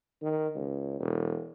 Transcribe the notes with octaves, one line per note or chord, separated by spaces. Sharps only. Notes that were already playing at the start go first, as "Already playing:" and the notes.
D#3
C#2
E1